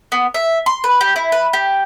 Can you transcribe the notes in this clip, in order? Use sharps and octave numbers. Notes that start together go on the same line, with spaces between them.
B3
E5
C6
B4
G4
E4
B4
G4